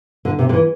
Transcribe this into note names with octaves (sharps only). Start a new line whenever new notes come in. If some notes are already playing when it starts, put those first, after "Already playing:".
D3
C3
D3
E3